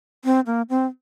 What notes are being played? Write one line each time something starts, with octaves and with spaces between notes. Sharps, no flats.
C4
A#3
C4